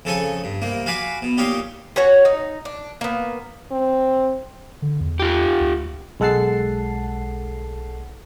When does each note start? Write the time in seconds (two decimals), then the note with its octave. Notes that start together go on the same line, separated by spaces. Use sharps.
0.05 F2 C#3 A4 C#5 G#5
0.44 G2
0.62 C2 A#3
0.86 F#4 F5 G#5 B5 D6
1.22 B2
1.37 A#2 D#4 G4 C#5 F5
1.96 C#4 F#4 C#5 F#5
2.25 D#4
2.65 D4
3.01 A#3 B3
3.72 C4
4.82 D3
5.00 E2
5.20 F4 G4
5.61 D2
6.20 B1 G#3 A4 F#5 A5 C7